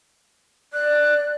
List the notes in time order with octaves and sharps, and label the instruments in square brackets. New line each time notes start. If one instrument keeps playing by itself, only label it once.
[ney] D5 [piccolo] F#6